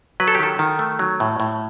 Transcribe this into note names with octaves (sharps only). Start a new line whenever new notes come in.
F#3 B4
A4
G4
D#3 A4
D#3
A3
F#3
A2
A2